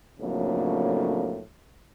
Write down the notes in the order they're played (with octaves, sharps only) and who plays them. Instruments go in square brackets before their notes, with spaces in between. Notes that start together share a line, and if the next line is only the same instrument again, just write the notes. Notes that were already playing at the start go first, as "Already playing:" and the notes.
[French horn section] F2 A2 C#3 F#3 A#3 D4